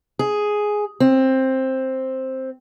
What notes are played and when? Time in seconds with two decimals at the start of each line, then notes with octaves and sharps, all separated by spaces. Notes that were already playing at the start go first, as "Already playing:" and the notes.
0.19 G#4
1.00 C4